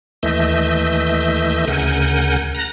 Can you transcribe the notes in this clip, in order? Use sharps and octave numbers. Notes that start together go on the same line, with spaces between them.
D#2 E3 A3 D#5 E5 G6
D2 C#3 A#4 F#5 G#5 G6
A#5 F#6 A#6